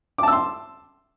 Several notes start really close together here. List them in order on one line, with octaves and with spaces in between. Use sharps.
D6 A5 E6 C6